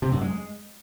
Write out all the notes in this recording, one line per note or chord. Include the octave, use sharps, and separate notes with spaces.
C3
F#2
G#3